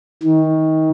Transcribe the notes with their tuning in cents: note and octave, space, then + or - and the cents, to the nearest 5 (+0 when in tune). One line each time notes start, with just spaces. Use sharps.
D#3 +25